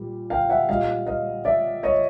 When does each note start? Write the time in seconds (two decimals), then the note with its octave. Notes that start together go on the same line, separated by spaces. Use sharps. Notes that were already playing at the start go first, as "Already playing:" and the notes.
Already playing: A#2 G3
0.30 F5 G5
0.50 E5 F#5
0.68 A#2 G3 D#5 F5
1.07 D#5 F5
1.45 D5 E5
1.83 C#5 D#5